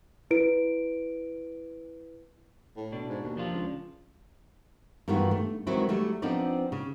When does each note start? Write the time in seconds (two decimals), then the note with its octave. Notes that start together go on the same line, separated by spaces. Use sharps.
0.31 E4 B4 D7
2.76 A2
2.92 B2 D4
3.09 G#2
3.22 D#2
3.37 F3 D4 F4
3.53 C#2
5.08 G2 D#3 E3 B3 F4 F#4
5.31 A3
5.67 D#3 E3 F#3 G#3 C4 E4
5.89 F#3 G3 A3
6.22 F3 B3 C4 D4 D#4 D5
6.72 C#3